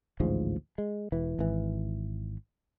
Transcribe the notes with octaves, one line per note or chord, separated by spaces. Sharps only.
A1 D2 G#2 F3
G#3
E1 E3
G#1 E3